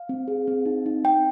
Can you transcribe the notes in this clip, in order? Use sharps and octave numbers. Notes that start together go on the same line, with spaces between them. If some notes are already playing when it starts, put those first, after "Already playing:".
Already playing: F5
C4
G#4
C4
D#4
D#4
C4 G5